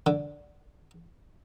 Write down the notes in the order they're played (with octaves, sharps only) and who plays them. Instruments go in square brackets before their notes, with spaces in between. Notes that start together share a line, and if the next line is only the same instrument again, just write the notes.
[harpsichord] D3